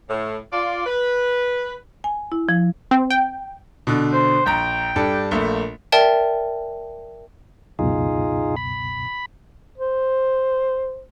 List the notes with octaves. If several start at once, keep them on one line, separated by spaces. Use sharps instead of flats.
A2
F4 D5
B4
G#5
E4
F3
C4
G5
B2 D3
C5
A#1 G5 A#5
G2 D4 A4
A#1 A3 A#3
A#4 D5 E5 G5 A5
C#2 F#2 B2 D#4 F4 G#4
B5
C5